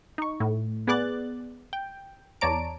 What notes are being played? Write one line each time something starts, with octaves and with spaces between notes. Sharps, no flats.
D#4 C#6
A2
B3 G#4 D5 F#6 A6
G5
E2 C#5 D5 A5 A#5 D7